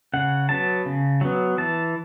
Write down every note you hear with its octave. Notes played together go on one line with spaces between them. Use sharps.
C#3 F#5
F#3 B3 A5
C#3
F#3 B3
E3 A5